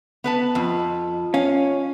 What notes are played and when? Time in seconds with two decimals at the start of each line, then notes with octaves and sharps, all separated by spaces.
0.24 B3 B4 A5
0.55 F2 F4 D#5
1.34 C#4 F5